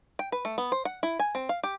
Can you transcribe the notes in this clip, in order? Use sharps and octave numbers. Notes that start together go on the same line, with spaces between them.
G5
B4
A3
B3
C5
F#5
E4
G#5
C4
F5
G4